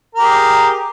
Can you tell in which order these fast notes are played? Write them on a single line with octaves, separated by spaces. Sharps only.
A#4 G4 G#4